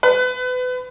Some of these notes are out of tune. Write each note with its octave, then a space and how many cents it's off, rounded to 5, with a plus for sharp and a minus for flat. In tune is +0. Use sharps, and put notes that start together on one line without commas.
B4 +30